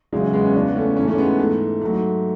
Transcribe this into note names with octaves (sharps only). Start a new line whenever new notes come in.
E2 C#3 F#3 G#3
G#3 B3
C#4
E2 C#3 E3 B3 D4
A3 C#4
G#2 E3 A3 C#4
A3 C#4
G#3 B3
G#2 E3 A3
G#2 F#3 A3